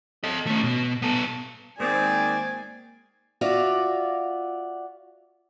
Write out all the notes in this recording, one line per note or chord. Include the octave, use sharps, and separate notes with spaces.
A4 D#5
A3 C#4
B2
B3 A4
G#2 D#3 G#3 A#3 C4 D5 G#5 C7
F4 F#4 D5 E5 F5